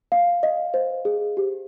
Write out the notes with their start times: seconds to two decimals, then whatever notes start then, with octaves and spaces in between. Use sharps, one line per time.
0.12 F5
0.43 D#5
0.74 C5
1.05 G#4
1.37 G4